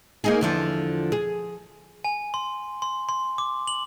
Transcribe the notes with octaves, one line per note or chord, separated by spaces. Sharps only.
A#3 D#4 G#4
E2 D3 F3
G#4
G#5
C6
C6
C6
D6
F#7